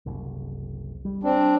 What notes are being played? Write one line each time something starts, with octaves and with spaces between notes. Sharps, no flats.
F#1 C2
G3
C4 D4